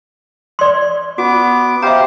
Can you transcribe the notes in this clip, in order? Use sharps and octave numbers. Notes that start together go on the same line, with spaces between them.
D5 C6
B3 F#4 D6
G4 C5 E5 F5 A#5